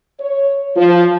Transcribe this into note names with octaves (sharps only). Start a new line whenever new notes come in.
C#5
F3